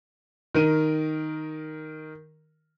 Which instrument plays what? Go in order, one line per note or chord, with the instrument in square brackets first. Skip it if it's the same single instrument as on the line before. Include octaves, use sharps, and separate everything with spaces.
[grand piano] D#3 A#4 D#7